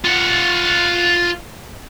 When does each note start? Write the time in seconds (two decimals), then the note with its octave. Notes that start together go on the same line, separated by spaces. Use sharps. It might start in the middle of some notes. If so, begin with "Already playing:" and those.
0.05 F4 F#5